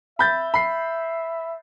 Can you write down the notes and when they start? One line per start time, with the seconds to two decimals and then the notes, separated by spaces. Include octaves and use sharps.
0.19 E5 B5 G6 A6
0.54 B5 C7